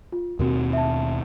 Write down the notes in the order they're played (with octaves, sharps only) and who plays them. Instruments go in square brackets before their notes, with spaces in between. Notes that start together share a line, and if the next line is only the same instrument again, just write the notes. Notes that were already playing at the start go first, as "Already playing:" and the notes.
[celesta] F4
[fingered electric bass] D#2 B2 C4 [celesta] F#4 A#4
[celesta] E5 A5